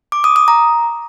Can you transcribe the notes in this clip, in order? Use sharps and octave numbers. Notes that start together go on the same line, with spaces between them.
D6
D#6
D#6
A#5